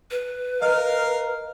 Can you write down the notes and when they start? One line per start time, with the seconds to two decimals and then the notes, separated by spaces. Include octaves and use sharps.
0.11 B4
0.62 A#4 D#5 F5 F6